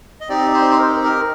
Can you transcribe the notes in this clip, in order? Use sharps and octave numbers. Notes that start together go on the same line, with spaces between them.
D#5
C4 D#4 G4 D5
C5
C5
A#4
A#4